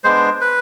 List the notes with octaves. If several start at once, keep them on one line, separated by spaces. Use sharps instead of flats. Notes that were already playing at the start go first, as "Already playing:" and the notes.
G#3 B3 D4 C5
B4